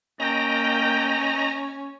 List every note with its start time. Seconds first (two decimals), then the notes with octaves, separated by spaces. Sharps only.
0.20 A#3 C#4 D#5 G5 A#5